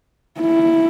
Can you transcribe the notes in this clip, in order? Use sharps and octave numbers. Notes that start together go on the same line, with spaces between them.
E4